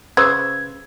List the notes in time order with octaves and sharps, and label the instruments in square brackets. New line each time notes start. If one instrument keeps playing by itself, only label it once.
[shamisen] C#3 B4 C5 [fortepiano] E6 [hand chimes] G#6